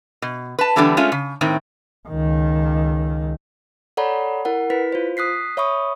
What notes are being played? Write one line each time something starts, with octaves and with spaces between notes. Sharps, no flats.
B2
B4 A5
D3 E3 G3 B3 D4 A4
G#3 A3 C#4 F4
C#3
A2 D#3 C4
C#2 D#3
A4 C#5 D5 F#5 A#5 B5
E4 A#4 F#5
E4 B4 B6
F4 C5
D#6 F#6 B6 C7
C#5 E5 B5 C#6 D#6